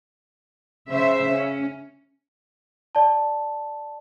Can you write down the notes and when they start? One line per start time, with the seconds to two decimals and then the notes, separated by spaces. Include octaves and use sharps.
0.89 C#3 C5 E5
1.30 C#4
2.95 D5 A5